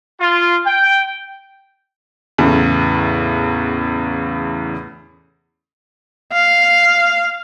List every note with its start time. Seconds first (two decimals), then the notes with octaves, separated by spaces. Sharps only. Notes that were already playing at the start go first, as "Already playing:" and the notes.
0.20 F4
0.66 G5
2.38 E2 A2 C#3
6.33 F5